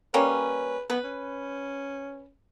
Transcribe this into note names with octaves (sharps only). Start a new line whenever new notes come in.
G3 A#3 C#4 B4
B3 B4
C#4